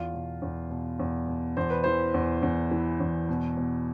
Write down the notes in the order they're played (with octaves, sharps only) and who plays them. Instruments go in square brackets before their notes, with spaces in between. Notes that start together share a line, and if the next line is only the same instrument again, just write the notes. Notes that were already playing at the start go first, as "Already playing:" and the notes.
Already playing: [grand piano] E2 F4
B2
E2
B2
E2
B2
E2 C5
B4
E3 C5
E2
E2
E3
E2
B2
B2